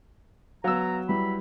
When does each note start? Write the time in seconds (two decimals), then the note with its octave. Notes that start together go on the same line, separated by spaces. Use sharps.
0.64 F#3 B3 F5 A#5 E6
1.09 G3 E4 B4 B5